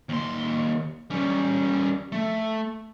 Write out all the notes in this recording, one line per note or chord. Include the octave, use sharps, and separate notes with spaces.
D#2 C6
G3 C#4
A3